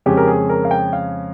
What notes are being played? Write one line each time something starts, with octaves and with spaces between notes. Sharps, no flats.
F2 C#3 G#3 C#4 G4
A#4
G#4
A#4
F5
G5
F5